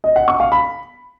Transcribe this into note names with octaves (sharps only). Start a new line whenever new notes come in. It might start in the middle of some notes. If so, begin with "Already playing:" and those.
D#5
F#5
C#6
F5
B5